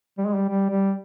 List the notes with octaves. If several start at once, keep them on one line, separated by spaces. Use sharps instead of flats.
G3
G#3
G3
G3
G3